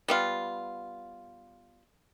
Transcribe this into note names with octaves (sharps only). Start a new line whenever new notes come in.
G3 B3 F4